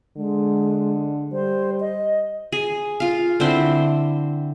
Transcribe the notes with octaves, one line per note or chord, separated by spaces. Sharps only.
D3 G#3
G3 C5
D#5
G#4
F4 F5
D3 C4 E4 C5